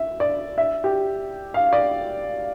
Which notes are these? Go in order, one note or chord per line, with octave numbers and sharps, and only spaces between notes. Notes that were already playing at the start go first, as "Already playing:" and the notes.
Already playing: E5
D5
E5
G4
F5
D5